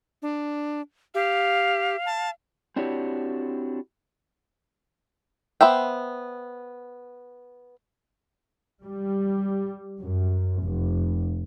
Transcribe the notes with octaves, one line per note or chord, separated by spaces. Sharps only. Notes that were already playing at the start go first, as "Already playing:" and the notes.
D4
G4 F5
A5
C4 D4 E4 F#4 G4 C#5
B3 C5 E5 G5
G3
F#2
F1